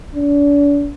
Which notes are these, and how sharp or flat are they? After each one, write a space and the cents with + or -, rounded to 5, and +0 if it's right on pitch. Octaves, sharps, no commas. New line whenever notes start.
D4 -40